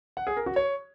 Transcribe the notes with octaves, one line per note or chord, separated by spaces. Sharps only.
F#5
G#4
A#4
F#4
C#5